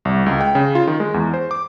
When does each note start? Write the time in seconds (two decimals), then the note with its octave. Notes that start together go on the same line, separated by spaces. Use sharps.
0.05 C2
0.26 C#2
0.41 G5
0.55 C#3
0.75 F4
0.87 D#3
1.00 G#3
1.14 E2
1.34 C5
1.51 D6